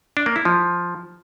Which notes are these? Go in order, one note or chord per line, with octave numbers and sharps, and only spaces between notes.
D4
A#3
E4
F3